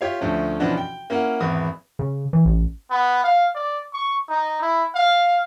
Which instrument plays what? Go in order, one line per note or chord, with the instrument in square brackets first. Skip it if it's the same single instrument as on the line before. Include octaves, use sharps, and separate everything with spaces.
[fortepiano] F4 G4 C#5 E5 F5
D2 F3 A3 C#4
B2 E3 F3 C#4 D4 F#4
G5
A#3 C#4 E4 A#4 F#5
G#1 E2 B3 D#6
[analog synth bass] C#3
E3
A1
[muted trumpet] B3
F5
D5
C#6
D#4
E4
F5